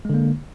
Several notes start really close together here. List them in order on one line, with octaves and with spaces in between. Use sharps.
G#3 D3 A#3